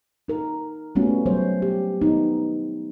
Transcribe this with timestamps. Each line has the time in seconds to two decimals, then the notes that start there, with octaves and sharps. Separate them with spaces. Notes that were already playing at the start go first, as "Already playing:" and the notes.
0.28 D#4 A#4
0.95 G3 A3 B3 C#4 F4 F#4
1.26 F#3 G3 C5 C#5
1.62 G4
2.02 B3 D#4